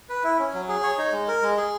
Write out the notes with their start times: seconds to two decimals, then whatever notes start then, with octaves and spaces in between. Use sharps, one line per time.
0.09 B4
0.24 E4
0.39 C#4
0.54 F#3
0.68 G#4
0.83 C#5
0.98 D#4
1.12 G#3
1.28 A#4
1.42 G#3
1.57 G#4